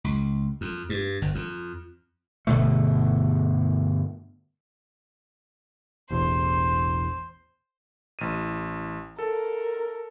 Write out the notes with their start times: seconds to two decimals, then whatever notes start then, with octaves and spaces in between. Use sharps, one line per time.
0.04 C#2
0.61 F2
0.89 G2
1.22 G1
1.35 F2
2.47 G1 B2 A3
6.10 E1 A1 E2 C5
8.19 A1 D#7
9.19 A4 A#4